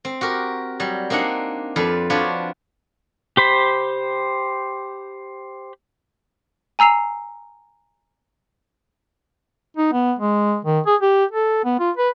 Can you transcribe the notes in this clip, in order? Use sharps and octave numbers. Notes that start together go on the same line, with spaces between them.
C4
F#4 G4 A#4
F#3 G3
A#3 C4 D4 D#4 F#5
F2 F4 B4 D5
F3 D4 F4 F#4 B4 C#5
G4 C5 B5
G#5 A#5 E6 C7 F7
D#4
B3
G#3
D#3
G#4
G4
A4
B3
F4
B4